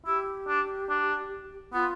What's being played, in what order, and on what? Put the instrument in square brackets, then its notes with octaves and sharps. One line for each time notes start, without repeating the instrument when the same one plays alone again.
[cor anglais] E4 [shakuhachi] G4
[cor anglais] D4
D4
[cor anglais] B3 [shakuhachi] F4